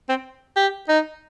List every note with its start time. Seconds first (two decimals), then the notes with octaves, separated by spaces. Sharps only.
0.09 C4
0.57 G4
0.89 D#4